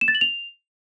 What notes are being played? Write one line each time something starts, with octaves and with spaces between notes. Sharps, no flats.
E7
A6
F#7
F7